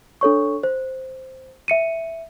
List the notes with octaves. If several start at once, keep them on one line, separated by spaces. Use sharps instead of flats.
D4 A4 C#5 C#6
C5
E5 C#7 D#7